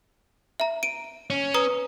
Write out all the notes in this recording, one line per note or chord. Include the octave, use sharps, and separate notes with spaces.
E5 A#5
D7 D#7
C#4
B4 A#5 D#6